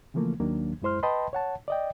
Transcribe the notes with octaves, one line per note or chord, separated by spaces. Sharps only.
C#3 E3 F3 A3 A#3
D#2 D#3 F#3 A#3 D4
F#2 G#3 E4 C5 C6 F6
B4 D#5 G5 A5 B5 C6
C#5 F#5 A5
D5 D#5 G5